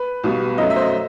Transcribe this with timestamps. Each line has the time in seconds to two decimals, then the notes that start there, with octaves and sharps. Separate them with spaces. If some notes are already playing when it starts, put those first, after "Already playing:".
Already playing: B4
0.24 B1 B2 G3
0.58 F#2 F#3 A3 D#5
0.70 E5
0.76 C5
0.81 D#5